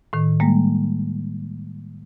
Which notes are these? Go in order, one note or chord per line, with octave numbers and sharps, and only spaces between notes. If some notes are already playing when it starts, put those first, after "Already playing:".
A2 D#3
G3 G#3 A#3